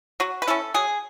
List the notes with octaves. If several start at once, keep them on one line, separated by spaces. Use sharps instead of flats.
F#3 F#4
B4
C#4 E4 A4
F#3 G#4